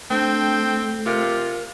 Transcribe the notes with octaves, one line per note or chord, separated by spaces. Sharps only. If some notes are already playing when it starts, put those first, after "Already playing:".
A3 C4 D4 G5
C3 F4 A#4